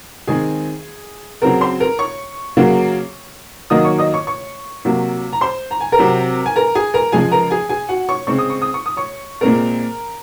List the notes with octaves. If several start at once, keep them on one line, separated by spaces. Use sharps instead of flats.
D#3 G#3 C4 G#4 G#5
C#3 F#3 C4 A#4 A#5
C5 C6
A#4 A#5
C#5 C#6
C#3 F#3 A#3
D#3 F#3 A#3 D#5 D#6
C#5 C#6
D#5 D#6
C#5 C#6
C#5 C#6
C3 F#3 A#3
A#5
C5 C6
A#5
G#5
A#4 A#5
C3 F#3 C4
G#5
A#4 A#5
G#4 G#5
A#4 A#5
C#3 F3 G#3 G#4 G#5
A#4 A#5
G#4 G#5
G#4 G#5
F#4 F#5
C#5 C#6
C#3 G#3 C4 C#6
D#6
C#6
D#6
C#6
D#6
C#5 C#6
A#2 G#3 C4 A#4 A#5